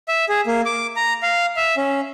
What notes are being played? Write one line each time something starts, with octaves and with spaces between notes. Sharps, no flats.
E5
G#4
A#3
D6
A#5
F5
E5
C#4